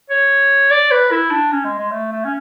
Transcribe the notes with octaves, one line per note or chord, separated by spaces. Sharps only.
C#5
D5
B4
E4
D4
C#4
G#3
G#3
A3
A3
C#4